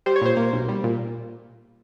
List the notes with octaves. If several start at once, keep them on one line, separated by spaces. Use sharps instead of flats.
G3 C5
C#5
A#2 C5
A#3
B1
G3
A#2